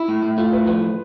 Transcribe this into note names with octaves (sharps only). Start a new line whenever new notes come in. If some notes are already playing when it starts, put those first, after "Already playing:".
Already playing: E4
A2
A2
A3 F4
A2 B4
F3 B4